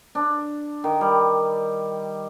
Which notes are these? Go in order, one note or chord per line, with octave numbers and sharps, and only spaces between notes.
D4
D#3
G3